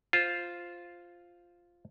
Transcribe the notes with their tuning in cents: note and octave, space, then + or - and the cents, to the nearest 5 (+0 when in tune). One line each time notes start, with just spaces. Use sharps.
F4 +0 C5 +0